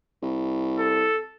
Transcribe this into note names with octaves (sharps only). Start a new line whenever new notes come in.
C2
A4